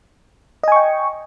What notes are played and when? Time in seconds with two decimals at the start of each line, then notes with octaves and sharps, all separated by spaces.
0.63 D#5
0.68 G#5
0.72 C#6
0.76 G5